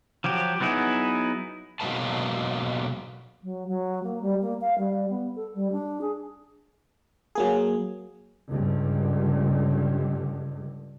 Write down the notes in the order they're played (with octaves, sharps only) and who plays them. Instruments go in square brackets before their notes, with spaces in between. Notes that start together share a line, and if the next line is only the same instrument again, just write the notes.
[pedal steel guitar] F3 F#3 G4
F#3 B3 D#4 E4 G#4
[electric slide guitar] B2 F#3 G#3 A#3 B4 A5
[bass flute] F#3
F#3
A#3
G3
A#3
F5
G3
B3
A4
G3
D4
G#4
[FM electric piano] F#3 A#3 G#4
[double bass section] C#2 G2 D3